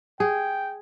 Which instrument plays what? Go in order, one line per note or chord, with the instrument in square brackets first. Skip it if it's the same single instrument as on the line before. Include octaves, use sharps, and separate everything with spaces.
[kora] G#4 [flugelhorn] G5